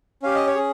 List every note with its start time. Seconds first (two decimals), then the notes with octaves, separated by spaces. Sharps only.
0.23 C#4 G4 F5
0.35 D#5
0.47 C#5
0.55 C#4 G#4